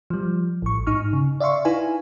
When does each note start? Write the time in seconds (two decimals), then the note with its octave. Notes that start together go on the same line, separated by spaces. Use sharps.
0.10 F3 G3
0.62 A1 C#6
0.87 G#2 D#4 C#6 F6
1.13 C#3
1.40 D5 E5 F5 C6 C#6
1.65 D#4 E4 B4 F5 G#5